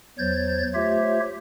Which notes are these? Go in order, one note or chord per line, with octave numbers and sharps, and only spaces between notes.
E2 F#3 C5 C#5 G6 A6
A3 F4 G4 C5 C#5 E5